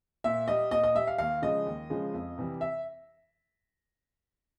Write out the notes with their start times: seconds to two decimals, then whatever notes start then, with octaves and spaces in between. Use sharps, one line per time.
0.24 A#2 E5
0.48 G3 D#5
0.71 A#2 D#5
0.84 D#5
0.95 G3 E5
1.07 F5
1.18 D#2 F5
1.42 C#3 F3 G#3 D#5
1.66 D#2
1.90 C#3 F3 G#3
2.14 F2
2.38 C3 E3 G3
2.61 E5